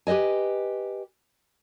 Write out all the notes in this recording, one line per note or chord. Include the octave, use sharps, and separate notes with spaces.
G4 B4 C5 D#5 G#5